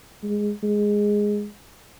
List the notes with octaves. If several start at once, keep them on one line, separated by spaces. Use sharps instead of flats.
G#3
G#3